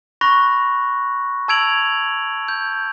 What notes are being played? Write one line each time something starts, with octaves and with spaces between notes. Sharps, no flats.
B5 C#6 F#6 A#6
A5 E6 G#6 D7 F7 F#7
G6